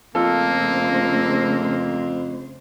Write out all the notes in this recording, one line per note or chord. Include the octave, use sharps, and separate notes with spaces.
F2 C#3 A3 A#3 F4 A4 C5